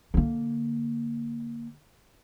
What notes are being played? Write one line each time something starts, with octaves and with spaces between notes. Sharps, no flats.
D3 A#3